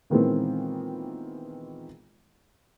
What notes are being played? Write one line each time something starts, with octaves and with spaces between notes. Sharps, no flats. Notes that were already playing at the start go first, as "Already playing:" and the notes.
A#2 D#3 E3 G#3 B3 C4